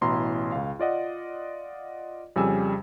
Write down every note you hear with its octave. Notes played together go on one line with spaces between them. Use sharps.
A1 B2 E4 A#5 C6
C#2 F5
F4 D5 D#5 F#5
F2 C#3 G3 G#4 G#5 E6